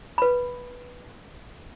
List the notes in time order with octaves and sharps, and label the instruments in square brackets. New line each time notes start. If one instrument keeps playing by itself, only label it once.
[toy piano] B4 B5